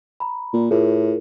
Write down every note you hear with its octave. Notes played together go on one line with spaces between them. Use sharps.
A#5 B5
A#2
A2 F4 G#4 A#4